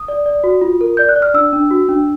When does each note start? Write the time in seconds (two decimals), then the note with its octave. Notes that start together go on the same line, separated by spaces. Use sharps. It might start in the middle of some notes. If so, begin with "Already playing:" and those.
Already playing: D#6
0.08 D5
0.26 D5
0.44 F#4
0.61 F4
0.81 A#4
0.97 D5 G6
1.09 F#6
1.16 D5
1.22 F6
1.34 D4 E6
1.53 D4
1.71 F#4
1.89 D4